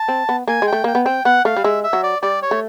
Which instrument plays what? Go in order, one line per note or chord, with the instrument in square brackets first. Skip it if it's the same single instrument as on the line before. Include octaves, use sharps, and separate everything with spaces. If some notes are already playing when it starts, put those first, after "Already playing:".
Already playing: [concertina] A5
[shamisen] C4
B3
[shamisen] A#3 [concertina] G#5
[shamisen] G#3
[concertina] G5
[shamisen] A3
[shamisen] A#3 [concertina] G5
[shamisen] B3
[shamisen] C4 [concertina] G5
[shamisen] B3 [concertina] F#5
[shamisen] A3 [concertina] F5
[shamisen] G3
[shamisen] G#3 [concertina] E5
[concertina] E5
[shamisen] F#3
[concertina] D5
[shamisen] G3 [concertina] D5
[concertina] C#5
[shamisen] A3